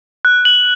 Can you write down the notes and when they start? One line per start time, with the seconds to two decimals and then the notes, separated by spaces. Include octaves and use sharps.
0.25 F#6
0.45 F#7